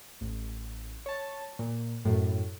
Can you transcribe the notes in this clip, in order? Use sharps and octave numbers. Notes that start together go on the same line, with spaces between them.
A1
C#5 A5
A#2
F#2 A2